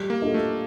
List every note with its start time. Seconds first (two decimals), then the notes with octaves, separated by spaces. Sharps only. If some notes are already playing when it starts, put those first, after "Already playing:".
Already playing: G3
0.10 A#3
0.22 D4 F4 A4 D#5
0.34 A3